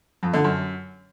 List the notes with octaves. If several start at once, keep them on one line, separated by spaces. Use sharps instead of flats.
F2
D3
F#2